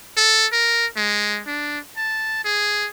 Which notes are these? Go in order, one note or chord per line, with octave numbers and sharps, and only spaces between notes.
A4
A#4
G#3
D4
A5
G#4